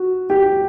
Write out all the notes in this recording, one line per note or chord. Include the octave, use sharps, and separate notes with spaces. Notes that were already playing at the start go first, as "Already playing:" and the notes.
Already playing: F#4
G4